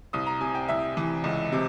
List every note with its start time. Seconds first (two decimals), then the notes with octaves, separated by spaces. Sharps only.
0.13 C2 D#6
0.27 A#5
0.41 C3 G#5
0.55 G5
0.68 C2 E5
0.97 E3
1.24 C#2
1.52 C3